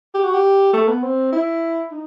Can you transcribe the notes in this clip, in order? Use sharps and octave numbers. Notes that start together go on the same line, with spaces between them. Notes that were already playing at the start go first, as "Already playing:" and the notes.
G4
F#4
G4
A3
B3
C4
E4
D#4